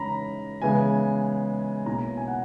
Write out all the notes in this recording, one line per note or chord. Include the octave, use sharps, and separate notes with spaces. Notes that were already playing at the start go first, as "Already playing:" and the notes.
Already playing: C#3 E3 G#3 C#4 A#5 B5
C#3 E3 G#3 B3 E4 G#5
B2 A#3 C#4 E4 A#5
G#5
F#5